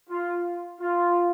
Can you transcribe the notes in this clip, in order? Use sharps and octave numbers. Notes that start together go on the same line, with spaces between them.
F4
F4